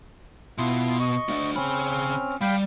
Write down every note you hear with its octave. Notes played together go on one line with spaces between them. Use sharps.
B2 E4 F4 C6
D#5 C#6
A3 D4
C#3 C4 C#4 B5 F6
G3 F5 G5 B5